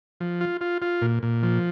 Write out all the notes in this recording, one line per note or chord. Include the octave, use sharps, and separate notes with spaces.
F3
F4
F4
F4
A#2
A#2
F3